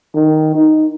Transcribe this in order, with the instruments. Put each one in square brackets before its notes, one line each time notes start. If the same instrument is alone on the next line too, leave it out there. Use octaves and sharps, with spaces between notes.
[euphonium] D#3
D#4